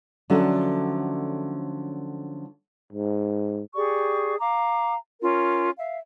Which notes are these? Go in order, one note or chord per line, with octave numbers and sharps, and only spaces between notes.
D3 F3 F#3 A3 C#4 D4
G#2
G4 G#4 D5 C#6
F5 A#5 D6
C#4 F4 A#4
E5 F5